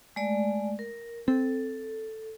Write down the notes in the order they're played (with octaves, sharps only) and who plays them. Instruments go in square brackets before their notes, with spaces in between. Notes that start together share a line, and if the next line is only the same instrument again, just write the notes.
[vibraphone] G#3 A3 D5
A#4
[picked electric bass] C4 [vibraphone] A4